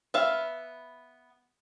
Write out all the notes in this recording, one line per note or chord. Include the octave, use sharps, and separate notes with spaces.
B3 E5 F5